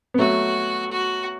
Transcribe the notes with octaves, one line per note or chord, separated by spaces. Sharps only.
B3
F#3 A3 F#4
F#4